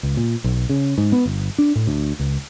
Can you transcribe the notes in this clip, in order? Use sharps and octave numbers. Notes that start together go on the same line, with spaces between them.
C#2
A#2
B1
C#3
G#2
B3
G1
D4
A2
D2
C#2